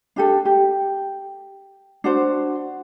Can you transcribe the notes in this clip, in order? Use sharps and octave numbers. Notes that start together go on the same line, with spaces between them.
D4 G4 A4
G4
D4 F#4 C5